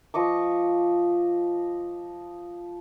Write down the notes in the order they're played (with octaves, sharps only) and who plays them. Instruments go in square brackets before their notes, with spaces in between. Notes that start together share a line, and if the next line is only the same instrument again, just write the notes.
[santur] F3 D#5 C#6 D6